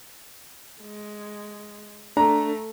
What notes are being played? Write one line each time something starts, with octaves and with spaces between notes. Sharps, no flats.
G#3
A3 D4 A#5